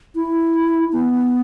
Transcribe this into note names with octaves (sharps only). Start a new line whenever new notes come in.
E4
B3